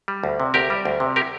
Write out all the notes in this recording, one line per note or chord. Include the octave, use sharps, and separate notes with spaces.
G3
D2
C3
D2 G4 A#4
G3
D2
C3
G4 A#4